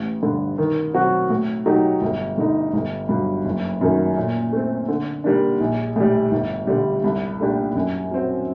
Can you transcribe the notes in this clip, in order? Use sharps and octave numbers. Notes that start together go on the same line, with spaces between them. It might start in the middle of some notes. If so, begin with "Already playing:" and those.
Already playing: A1
G2 D3
D#3
F#3 C4 F#4
A2
F#3 A3 D#4 G4
G1
G2 D3 A3 D#4
G1
G2 F#3
F#1
F#2 D#3 F#3 A3
A#2
A3 C4
D3
G3 A#3 D4
A#1
A2 G3
G1
G2 D3 G3
C2
A#2 A3 D4 G4
F#2
F#3 C4